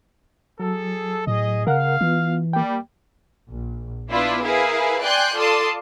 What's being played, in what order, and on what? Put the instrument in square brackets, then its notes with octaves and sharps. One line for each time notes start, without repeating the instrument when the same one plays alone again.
[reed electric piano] F#3 [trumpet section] G#4 A4
[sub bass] A2 [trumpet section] G#4 D#5
[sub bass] C#3 [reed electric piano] A#4 F#5 [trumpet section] F5
[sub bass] E3 [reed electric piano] B3 F4
[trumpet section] G3 [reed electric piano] A#3 G5
[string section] A#1
B3 D4 E4 F4 B4 D5
E4 G#4 A#4 B4 F5
D5 G5 G#5 C6 F#6 G6
F4 A4 D5 A5 C6 D#6